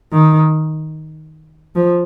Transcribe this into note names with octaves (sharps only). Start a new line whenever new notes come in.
D#3
F3